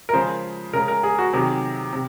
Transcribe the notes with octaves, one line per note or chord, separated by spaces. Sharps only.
A#4
C#3 F3 G#3 C5
C#3 G#3 A#4
A#4
G#4
F#4
C3 D#3 F#3 G#4
C3